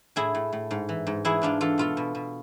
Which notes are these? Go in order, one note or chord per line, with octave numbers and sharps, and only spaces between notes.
A2 E4 G#4
A2
A2
G#2
E3
G#2
E3 E4 G#4
G#2 D4 F4
E3 F4 A4
B2 F4 A4
B2
B2